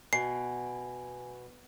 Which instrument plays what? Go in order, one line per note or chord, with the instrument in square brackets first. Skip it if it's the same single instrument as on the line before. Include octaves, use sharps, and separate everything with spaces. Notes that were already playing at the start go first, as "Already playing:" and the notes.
[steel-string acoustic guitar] B2 [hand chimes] G#5 [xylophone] C7